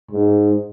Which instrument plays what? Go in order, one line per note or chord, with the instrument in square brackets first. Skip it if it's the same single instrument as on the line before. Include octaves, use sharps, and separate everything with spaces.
[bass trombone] G#2